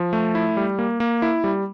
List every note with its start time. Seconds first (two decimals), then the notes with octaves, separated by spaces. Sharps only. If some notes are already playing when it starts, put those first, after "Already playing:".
Already playing: F3
0.13 A3
0.35 E4
0.57 G3
0.79 A#3
1.00 A#3
1.22 E4
1.44 G3